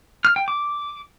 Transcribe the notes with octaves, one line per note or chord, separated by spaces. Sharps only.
F6
G5
D6